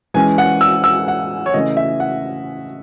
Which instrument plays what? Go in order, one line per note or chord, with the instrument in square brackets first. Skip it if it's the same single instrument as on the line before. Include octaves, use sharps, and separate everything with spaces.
[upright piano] E3 G#3 C#4 G#5
F#5
E6
E6
F#5
C#5
C#3 E3 A3 C#4 D#5
E5
F#5